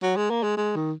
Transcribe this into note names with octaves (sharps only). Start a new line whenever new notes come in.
F#3
G#3
A#3
G#3
G#3
D#3